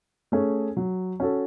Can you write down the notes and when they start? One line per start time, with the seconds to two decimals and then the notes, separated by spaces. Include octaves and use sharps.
0.32 A3 C#4 G#4
0.77 F#3
1.20 C#4 F#4 A4